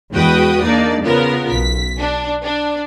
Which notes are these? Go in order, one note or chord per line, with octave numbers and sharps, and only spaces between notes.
E2 G#3 F#4 B4 G5 D#6
A#3 D4 D#4 D5
C#3 B3 F4 A#4
B1 B6
D4
D4